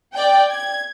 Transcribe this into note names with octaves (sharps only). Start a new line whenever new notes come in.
D5 G5
G#6